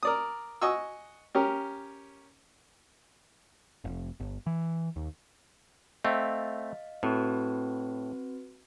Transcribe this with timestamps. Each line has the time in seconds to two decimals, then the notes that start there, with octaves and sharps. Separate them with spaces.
0.03 A#4 D5 D#6
0.62 D#5 F#5 G#5 C#6 E6
1.35 C#4 G4 A#4
3.84 F1
4.20 G1
4.46 E3
4.96 D#2
6.05 A3 C4 D#5 F5
7.03 A2 C4 F#4 B4